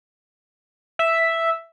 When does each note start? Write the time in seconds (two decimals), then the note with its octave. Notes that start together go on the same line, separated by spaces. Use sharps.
0.99 E5